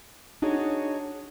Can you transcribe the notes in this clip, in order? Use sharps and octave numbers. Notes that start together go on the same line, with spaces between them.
D4 D#4 F#4 G#4 C#5